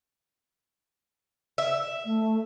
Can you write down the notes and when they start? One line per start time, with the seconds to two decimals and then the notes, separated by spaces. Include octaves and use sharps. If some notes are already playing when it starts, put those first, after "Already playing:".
1.58 E5
2.05 A3